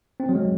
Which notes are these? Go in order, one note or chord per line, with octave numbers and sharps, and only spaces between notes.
C4
F#3
G#3